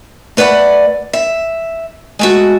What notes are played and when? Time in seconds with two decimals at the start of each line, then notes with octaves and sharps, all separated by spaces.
0.37 A3 B4 D5 F5 F#5
1.13 E5
2.19 G#3 A3 F#4